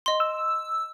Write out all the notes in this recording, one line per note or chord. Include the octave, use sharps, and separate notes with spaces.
D#5 C6
E6